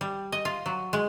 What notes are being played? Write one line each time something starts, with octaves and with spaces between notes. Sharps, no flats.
G3
D#5
F4
F#3
G#3